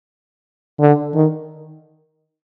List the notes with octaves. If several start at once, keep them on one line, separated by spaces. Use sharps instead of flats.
D3
D#3